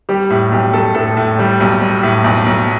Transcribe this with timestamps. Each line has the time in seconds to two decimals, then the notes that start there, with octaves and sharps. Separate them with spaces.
0.09 G3 G4
0.30 A2
0.52 B1 G4
0.74 B1 A4
0.95 A2 A4
1.17 A2
1.39 G3
1.60 B1
1.81 G3
2.03 A2
2.24 B1
2.46 B1